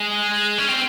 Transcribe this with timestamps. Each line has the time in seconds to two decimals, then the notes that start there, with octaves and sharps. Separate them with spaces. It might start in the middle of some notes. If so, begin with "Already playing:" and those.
Already playing: G#3
0.58 C#4
0.68 C4